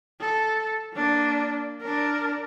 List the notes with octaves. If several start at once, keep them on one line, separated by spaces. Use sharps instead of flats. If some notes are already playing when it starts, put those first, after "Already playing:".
A4
A#3 D4
D4 A#4